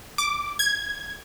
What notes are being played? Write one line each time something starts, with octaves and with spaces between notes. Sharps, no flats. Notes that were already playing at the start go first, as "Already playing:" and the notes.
D6
G#6